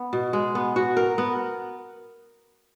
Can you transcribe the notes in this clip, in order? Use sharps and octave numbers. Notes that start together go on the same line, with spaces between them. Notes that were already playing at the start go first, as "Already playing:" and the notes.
Already playing: B3
B2
G#3
B3
F#4
A#4
B3